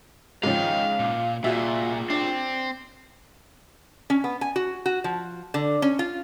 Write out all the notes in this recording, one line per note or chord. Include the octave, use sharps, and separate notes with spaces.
G#2 C#3 F3 D#5 F5 G5
A#2
A#2 F4 F#4 G#4 E5
C4 D4
C#4
B3
G#5
F#4
F#4
F3
D3
C#4
F4